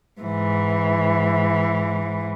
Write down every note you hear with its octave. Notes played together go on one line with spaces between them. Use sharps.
G#2 E3